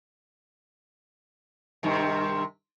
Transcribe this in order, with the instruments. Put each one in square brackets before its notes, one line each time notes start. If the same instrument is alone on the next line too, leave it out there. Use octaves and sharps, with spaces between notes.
[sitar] G2 C3 D#3